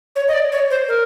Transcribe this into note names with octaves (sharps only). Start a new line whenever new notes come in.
C#5
D#5
D5
C#5
C5
A#4